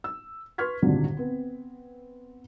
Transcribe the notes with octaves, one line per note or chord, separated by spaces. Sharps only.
E6
B4 C6 C#6 F6 G#6 B6
G#1 D2 G2 A#2 D3 D#3
B3 C4